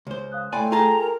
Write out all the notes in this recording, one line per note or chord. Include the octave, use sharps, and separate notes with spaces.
C#2 C5
F5 D#6 F#6
A2 A3 D5 G5 G#5 B5 C6
F4 G#4 A4 G5 A5 A#5
A#4